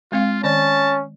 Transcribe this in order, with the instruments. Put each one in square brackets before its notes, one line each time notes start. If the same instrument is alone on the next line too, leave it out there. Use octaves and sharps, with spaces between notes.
[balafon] G#3 C4 F5 [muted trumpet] F4
[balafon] D#3 D5 [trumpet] C#4 [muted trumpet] A5